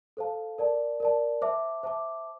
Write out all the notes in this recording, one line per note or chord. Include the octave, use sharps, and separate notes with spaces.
A4 C5 F5 A5
A#4 D5 A5
A#4 D5 A5
C5 E5 A5 D6
C5 E5 A5 D6